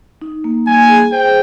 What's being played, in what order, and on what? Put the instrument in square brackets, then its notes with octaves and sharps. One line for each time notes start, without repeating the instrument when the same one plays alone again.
[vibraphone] D#4
A#3
[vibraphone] G3 [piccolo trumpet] G#5
[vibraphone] G#4
[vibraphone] C5 [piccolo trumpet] G5